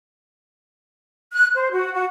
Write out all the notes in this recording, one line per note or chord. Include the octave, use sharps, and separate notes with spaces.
F#6
C5
F#4
F#4